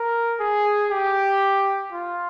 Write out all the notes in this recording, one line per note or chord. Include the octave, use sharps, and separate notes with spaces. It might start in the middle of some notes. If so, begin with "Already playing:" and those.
Already playing: A#4
G#4
G4
F4